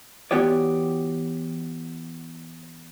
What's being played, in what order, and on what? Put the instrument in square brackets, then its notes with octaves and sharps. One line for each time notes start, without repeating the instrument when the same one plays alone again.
[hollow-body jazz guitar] E3 B3 F#4 G4 C#5 D5